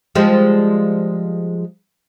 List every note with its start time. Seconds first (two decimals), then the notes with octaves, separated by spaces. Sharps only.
0.15 F3 G3 G#3